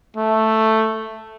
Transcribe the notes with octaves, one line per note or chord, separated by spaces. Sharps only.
A3